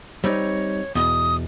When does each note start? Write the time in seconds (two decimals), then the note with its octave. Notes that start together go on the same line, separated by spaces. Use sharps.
0.24 G3 C4 D#4 C#5
0.95 E2 B2 D#6